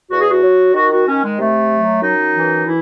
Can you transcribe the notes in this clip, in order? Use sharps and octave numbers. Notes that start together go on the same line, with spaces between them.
E2 F#4
G#4
F#4
F#3
D#3 F#4
F#4
D#3 C#4
G#3
C3 A3
F#3
F#2 D#4
E3
E3 E4